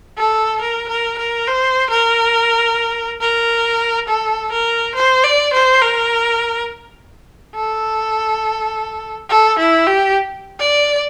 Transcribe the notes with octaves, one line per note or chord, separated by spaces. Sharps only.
A4
A#4
A#4
A#4
C5
A#4
A#4
A4
A#4
C5
D5
C5
A#4
A4
A4
E4
G4
D5